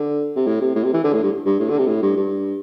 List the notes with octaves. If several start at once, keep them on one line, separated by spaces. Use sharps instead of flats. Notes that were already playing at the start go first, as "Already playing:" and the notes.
Already playing: D3
C3
A2
C3
A2
C3
E3
D3
A2
G2
G2
A2
D3
C3
A2
G2
G2